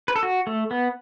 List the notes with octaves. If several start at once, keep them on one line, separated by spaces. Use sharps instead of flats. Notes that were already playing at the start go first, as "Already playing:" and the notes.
B4
A4
F#4
A3
B3